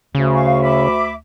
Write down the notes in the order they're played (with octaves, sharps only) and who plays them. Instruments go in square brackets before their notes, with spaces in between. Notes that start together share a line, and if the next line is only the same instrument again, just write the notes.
[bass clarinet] D2 [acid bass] C#3
[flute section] F5 C#6
E5 B5 D6